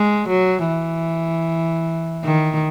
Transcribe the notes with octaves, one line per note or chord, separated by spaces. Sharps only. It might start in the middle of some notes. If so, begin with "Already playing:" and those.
Already playing: G#3
F#3
E3
D#3